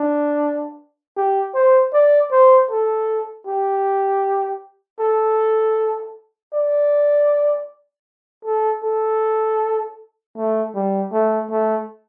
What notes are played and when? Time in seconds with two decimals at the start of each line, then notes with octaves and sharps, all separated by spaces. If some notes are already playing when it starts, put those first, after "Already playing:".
Already playing: D4
1.17 G4
1.55 C5
1.93 D5
2.31 C5
2.71 A4
3.47 G4
5.00 A4
6.53 D5
8.45 A4
8.84 A4
10.37 A3
10.75 G3
11.13 A3
11.51 A3